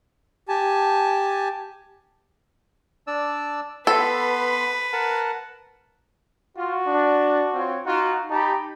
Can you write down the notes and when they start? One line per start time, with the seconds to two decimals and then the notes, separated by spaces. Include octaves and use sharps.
0.49 G4 G#5 A5
3.07 D4 D5 E6
3.87 B3 A4 B4 B5 C6
4.93 A#4 F#5 A5
6.57 F4 F#4
6.88 D4
7.54 C4 F4 C#5
7.86 D#4 F4 F#4
8.30 D#4 G4 A5 B5